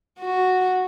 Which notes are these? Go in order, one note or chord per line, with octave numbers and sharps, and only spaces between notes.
F#4